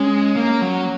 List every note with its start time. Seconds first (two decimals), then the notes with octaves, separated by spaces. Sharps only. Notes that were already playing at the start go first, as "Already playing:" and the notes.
Already playing: G#3 C#4
0.36 A#3
0.62 F#3